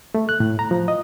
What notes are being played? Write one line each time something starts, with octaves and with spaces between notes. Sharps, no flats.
A3
F#6
A2
A#5
F3
D#5